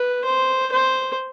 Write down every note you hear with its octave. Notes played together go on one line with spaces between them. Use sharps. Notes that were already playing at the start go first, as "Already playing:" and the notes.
Already playing: B4
C5
C5